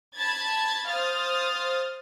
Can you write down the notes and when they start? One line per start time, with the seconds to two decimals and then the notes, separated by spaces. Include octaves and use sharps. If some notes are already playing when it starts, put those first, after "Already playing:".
0.15 A5 B5 G#6 A6
0.88 C5 F5 D#6 F6 A6